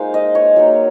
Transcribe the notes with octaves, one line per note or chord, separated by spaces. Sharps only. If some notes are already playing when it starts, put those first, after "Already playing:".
Already playing: G#3 A#3 D#4 F4 C5 F5
D#5
C#5
F#3 A#3 D#4